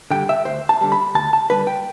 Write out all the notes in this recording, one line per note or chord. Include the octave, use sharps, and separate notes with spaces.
D3 G3 G5
E5
D2 C5
A5
D3 G3
B5
D2 A5
A5
D3 G3 B4
G5